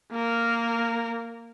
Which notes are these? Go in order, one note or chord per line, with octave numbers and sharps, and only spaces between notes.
A#3 A#4